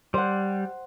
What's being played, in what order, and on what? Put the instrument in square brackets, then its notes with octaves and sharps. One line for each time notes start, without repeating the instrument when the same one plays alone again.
[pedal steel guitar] G3 [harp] C5 F#5